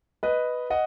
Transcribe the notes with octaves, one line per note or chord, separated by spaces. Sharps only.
B4 D#5
D#5 F#5